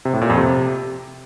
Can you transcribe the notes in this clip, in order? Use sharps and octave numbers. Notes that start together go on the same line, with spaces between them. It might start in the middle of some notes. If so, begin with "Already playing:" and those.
C3
A2
A#2
F2
C3